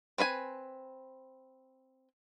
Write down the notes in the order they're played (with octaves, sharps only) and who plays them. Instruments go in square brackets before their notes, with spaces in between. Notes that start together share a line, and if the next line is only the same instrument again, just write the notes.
[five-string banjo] C4 B4 F5 G#5